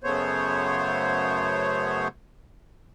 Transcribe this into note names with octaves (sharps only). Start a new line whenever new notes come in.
F#2 C#3 A3 B3 C5 C#5